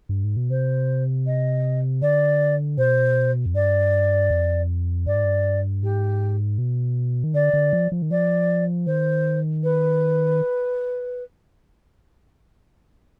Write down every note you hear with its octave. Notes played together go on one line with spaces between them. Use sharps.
G2
G#2
B2
C3 C5
D#5
D3 D5
B2 C5
F2
G2 D5
F2
G2 D5
G#2
G2
G#2 G4
B2
D#3
D3 D5
D3
F3
F3
D#3
F3 D5
D#3 C5
B4